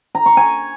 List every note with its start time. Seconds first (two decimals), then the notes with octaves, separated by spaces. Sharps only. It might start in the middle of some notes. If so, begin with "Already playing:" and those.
0.15 A#5
0.26 C#6
0.37 G#5